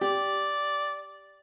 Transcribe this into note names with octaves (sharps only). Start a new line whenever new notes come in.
G4 D5